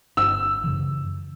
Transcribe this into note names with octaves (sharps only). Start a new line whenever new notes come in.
G1 E6
F#2 C#3 E3